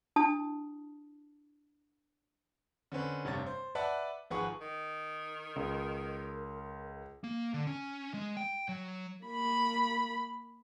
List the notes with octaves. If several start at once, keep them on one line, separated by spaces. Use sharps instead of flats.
D4 E4 A5 D#6
D3 C4 C#4 B4
F1 G2 C3 C#5 A6
C5
B4 D5 E5 F#5 A5
G#1 F3 G#4 B4 F#5 C#6
D#3
C#2 A#4
A#3
D3
C#4
G#3
G5
F#3
A#3 B5